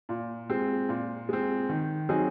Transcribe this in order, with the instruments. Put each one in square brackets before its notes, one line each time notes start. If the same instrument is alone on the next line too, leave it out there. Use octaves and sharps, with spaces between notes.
[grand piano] A#2
G#3 C4
A#2
G#3 C4
D#3
F#3 C4 D#4 G#4